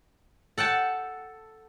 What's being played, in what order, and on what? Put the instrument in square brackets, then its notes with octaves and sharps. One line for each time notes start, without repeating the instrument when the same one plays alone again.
[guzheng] A4 F#5 G5 A5